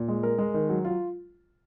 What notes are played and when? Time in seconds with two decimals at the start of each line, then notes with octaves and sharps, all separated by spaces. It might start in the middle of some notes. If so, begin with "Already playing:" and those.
Already playing: A#2
0.08 G#3
0.23 A#4
0.38 G#3
0.54 D#3
0.69 F#3
0.85 F4